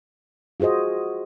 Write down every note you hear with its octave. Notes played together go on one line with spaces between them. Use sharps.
F4 F#4 G#4 C5 D#5